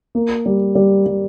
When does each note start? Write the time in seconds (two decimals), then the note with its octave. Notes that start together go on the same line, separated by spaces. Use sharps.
0.15 A#3
0.46 G3
0.75 G3
1.06 G3